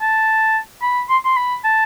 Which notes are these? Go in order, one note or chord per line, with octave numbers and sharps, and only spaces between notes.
A5
B5
C6
C6
B5
A5